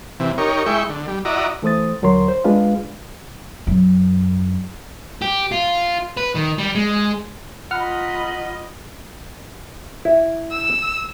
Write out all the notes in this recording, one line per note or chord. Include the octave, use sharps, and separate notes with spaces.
C3 E3
D#4 G4 A#4 C#5
G#3 E4 G5 C#6
D3
G3
E4 F#4 D5 D#5 A#5
E3 A3 C5 D#6 A6
D#2 D3 F#3 A#4 C#5 C6
C5
G#3 D4 F4 B4 F5
F#2
G4
F4
B4
D#3
G3
G#3
F4 D#5 F#5 A#5 B5 F6
E4
E6